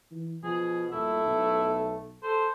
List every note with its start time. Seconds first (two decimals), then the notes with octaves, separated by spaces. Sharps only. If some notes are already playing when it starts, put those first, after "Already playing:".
0.11 E3
0.44 B2 F3 G#4
0.92 D#1 A3 E4
1.26 B1
2.23 A4 C5